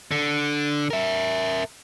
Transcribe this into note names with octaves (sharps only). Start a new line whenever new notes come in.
D3
A#4 E5